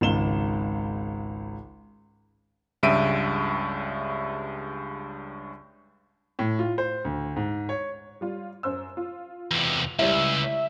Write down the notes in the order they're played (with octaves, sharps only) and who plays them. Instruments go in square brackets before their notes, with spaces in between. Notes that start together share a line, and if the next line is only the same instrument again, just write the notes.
[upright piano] G#1 C#2 E7 G7
[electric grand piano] C#2 G2 C#3 E5 D7 D#7
[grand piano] A2
F4
C5
D2
G#2
C#5
[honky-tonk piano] G3 F4
F#2 C5 E6
F4
[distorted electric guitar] E2 C3
[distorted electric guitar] C#2 [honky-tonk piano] G3 C#4 E4 [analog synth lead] E5